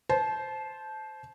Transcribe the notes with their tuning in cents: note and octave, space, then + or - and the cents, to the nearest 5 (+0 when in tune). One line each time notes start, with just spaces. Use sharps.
C5 +0 A5 -25